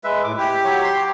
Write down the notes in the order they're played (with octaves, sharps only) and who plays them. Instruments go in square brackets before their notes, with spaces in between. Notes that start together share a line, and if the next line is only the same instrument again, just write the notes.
[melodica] G#3 B4 E5
[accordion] A2 [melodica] D6
[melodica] E4 [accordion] G4
[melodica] F#3 C#5
C6
A#5